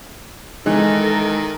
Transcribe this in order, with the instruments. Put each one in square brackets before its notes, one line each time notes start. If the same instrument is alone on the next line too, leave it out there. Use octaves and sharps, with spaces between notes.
[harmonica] D#3 [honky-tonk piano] E3 [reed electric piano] G#3 [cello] A4 A#4